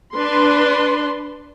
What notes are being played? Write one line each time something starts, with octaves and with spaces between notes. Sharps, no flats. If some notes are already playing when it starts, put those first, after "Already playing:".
D4 B4 C6